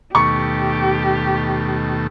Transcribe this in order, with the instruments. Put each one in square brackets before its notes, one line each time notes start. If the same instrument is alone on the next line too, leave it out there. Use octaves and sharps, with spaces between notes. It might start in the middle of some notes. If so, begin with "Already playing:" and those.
[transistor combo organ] D#2 B2 A3 [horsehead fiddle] G4 [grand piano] C#6